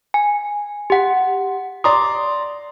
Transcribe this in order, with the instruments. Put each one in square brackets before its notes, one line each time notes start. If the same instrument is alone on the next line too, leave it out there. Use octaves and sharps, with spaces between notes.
[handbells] G#5
G4 F#5
[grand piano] D5 A#5 C6 [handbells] D#6